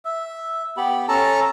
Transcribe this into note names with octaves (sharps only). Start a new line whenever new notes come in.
E5
B3 G4 B5
C#4 A4 A5 A#5